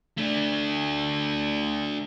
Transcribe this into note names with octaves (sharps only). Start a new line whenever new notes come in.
A3 D4